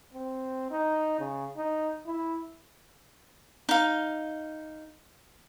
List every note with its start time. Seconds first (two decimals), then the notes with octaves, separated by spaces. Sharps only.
0.14 C4
0.71 D#4
1.19 C#3
1.57 D#4
2.07 E4
3.69 D#4 F5